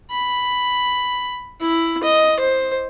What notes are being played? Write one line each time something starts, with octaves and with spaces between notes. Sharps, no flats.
B5
E4
D#5
C5